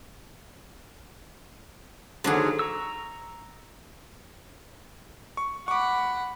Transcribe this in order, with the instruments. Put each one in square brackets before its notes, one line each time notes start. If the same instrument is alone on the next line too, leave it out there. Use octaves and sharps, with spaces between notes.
[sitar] D#2 G#2 F#3 [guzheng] D3 D4 G#4
[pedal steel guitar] A#5 C#6 E6
[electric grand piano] C#6
[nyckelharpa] F#5 B5 [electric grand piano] C#6 D6